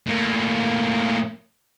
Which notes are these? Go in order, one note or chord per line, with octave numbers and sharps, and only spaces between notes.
A2 A#3